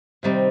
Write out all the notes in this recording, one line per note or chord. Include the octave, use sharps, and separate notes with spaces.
C3 D#3 G3 C4 D#4